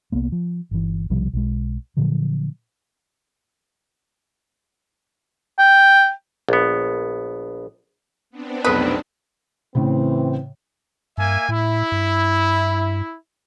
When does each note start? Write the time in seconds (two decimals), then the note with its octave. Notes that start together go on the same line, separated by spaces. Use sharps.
0.12 C2 A#3 B3
0.32 F3
0.71 G1 E3
1.10 B1 C3 F3 G3
1.33 B1 G#3
1.97 A#2 D3 F3 F#3
5.59 G5
6.49 A#1 B3
8.30 B3 C4 D4
8.65 F1 B1 B4 D#6
9.75 A2 C#3 E3 C4
11.18 G2 A#3 E5 G#5
11.49 A2 E4
11.92 G2